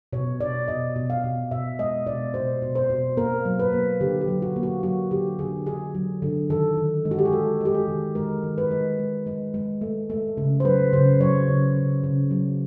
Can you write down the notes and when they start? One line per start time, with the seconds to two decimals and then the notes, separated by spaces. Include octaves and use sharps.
0.13 B2 C#5
0.40 B2 D5
0.68 B2 D#5
0.96 B2
1.10 F5
1.24 B2
1.51 B2 E5
1.79 G#3 D#5
2.06 B2 D5
2.34 B2 C5
2.62 B2
2.75 C5
2.89 B2
3.17 A#3 A#4
3.45 F#3
3.60 B4
3.73 A#3
4.01 D3 G4
4.21 G4
4.28 F#3
4.42 F#4
4.56 A#3
4.63 F#4
4.83 F#3 F#4
5.11 D3 G4
5.39 D3 G#4
5.66 D3 G#4
5.95 F#3
6.22 D3
6.50 D#3 A4
6.77 D#3
7.05 G#3
7.11 F#4
7.19 G4
7.25 G#4
7.33 G#3 A4
7.61 G#3 G4
7.75 G#4
7.88 D#3
8.15 G#3 A#4
8.44 D#3
8.58 B4
8.71 G#3
8.99 G#3
9.27 G#3
9.54 G#3
9.81 A3
10.10 A3
10.37 C#3
10.60 C5
10.65 F#3 B4
10.93 C#3 C5
11.20 F#3 C#5
11.48 C#3
11.76 C#3
12.04 C#3
12.31 F#3